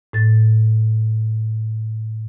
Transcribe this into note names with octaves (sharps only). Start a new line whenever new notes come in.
A2 A6